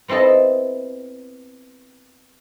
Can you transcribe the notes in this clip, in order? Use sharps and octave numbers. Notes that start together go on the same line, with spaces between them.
B3 C4 E4 A4 D#5